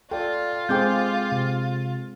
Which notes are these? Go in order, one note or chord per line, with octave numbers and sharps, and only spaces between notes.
F4 A4 D5 G5
G#3 C4 G#4 G5 D6 G6
C3